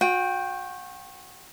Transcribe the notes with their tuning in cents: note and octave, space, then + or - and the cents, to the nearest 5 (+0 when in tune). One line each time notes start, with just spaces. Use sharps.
F#4 -35 G5 +0